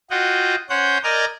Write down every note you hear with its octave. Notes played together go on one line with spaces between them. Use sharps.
F4 F#4 D#5 F#5 G5
C#4 C5 C#5 F#5 G6
A#4 D5 D#5 G#5 F6 G6